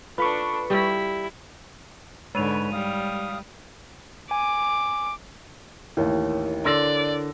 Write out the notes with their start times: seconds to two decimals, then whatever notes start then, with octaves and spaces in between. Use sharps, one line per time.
0.18 D4 F4 A4 B4 B5 C#6
0.70 G3 E4
2.35 G#2 D3 G#3 B4 C#5 D#7 F7
2.72 G3 F5 D#6
4.31 G#5 D6
5.97 A1 D#2 E4 A#4 C#5
6.65 D3 D5 C6 E6 A#6